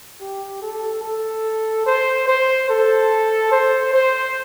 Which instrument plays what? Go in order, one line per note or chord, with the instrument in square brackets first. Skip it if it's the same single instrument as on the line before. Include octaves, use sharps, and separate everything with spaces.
[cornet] G4
A4
A4
C5
C5
A4
C5
C5